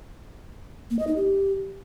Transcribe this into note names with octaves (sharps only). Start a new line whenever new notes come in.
A#3
D#5
D#4
G4